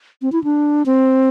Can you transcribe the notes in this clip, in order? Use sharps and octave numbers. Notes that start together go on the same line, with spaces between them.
C4
E4
D4
C4